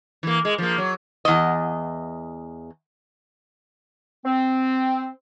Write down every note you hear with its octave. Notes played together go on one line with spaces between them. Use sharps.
E3 A#3
G#3
F3 A#3
F#3
E2 D#5
C4